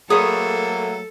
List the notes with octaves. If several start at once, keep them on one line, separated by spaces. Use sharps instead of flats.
F#3 A3 A#3 G#4 A4 B4 C#5 D#6